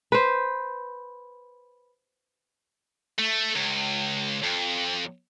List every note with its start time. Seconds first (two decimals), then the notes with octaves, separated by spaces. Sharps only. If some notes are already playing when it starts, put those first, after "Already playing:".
0.12 B4 C5
3.18 A3
3.55 C#2
4.44 F2